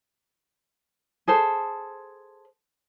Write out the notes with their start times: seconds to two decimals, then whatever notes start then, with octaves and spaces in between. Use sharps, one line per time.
1.27 G#4 A4 C5